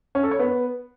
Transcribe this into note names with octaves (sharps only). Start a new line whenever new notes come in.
C#4
A4
C#5
B3